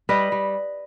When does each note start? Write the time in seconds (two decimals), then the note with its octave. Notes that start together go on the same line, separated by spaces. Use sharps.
0.09 G3 B4 D#5
0.32 G3